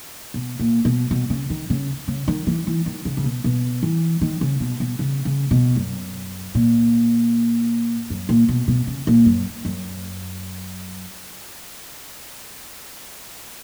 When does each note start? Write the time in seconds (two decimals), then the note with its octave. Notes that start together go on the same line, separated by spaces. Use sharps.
0.34 B2
0.59 A#2
0.85 B2
1.11 B2
1.30 C#3
1.50 D#3
1.70 C#3
2.08 C#3
2.28 D#3
2.47 E3
2.67 E3
2.86 D#3
3.05 C#3
3.17 C#3
3.24 B2
3.44 B2
3.83 E3
4.21 D#3
4.41 C#3
4.60 B2
4.80 B2
4.99 C#3
5.25 C#3
5.51 B2
5.76 F#2
6.55 A#2
8.10 F#2
8.29 A#2
8.49 B2
8.68 B2
8.87 C#3
9.07 A#2
9.26 F#2
9.65 F#2